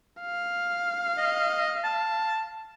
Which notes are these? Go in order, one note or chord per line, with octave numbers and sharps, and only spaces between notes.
F5
D#5
A5